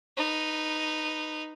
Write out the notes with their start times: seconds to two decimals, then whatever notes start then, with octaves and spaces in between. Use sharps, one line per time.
0.17 D#4 B4